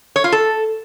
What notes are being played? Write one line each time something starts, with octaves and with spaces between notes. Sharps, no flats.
C#5
F4
A4